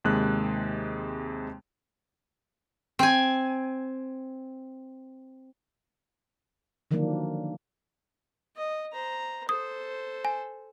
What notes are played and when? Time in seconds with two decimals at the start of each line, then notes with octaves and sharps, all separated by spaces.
0.04 D#2 C3 G#3 F#6
2.99 C4 G#5
6.91 D3 D#3 F3 F#3 A#3 D4
8.57 D#5
8.93 C5 A#5
9.49 A4 C5 D#6
10.25 G#5